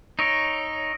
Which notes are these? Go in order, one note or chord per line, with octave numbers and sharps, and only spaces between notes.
D#4 C#5 E6 A#6 D7